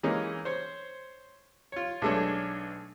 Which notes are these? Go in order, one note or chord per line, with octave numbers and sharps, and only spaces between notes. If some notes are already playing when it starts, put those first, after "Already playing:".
E3 G#3 A#3 C#4 D#4
C5 C#5
F4 C#5
B1 G#3 A3 D4 C#5